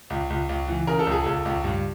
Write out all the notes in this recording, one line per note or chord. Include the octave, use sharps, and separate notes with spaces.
C#2
C#2
C#2
E3
C#3 A#4
A4
C#2 G#4
C#2 A4
C#2
G2